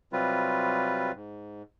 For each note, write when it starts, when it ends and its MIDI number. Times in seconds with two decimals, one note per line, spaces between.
0.13 1.12 48
0.13 1.12 54
0.13 1.12 55
0.13 1.12 60
0.13 1.12 65
0.13 1.12 71
1.15 1.63 44